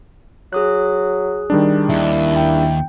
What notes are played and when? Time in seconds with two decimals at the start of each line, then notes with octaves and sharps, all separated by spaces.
0.53 F#3 G#4 D#6 F#6
1.50 D#3 G3 D4
1.89 D#2 E4
2.36 G5